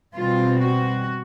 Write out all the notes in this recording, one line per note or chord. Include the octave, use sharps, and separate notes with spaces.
B2 G3 C4 F4
F#4